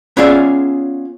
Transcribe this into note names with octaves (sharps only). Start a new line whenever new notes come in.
B3 C#4 F4 G#4 D5 E5